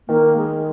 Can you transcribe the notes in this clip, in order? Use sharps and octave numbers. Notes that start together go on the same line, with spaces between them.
D#3 A#3
G#3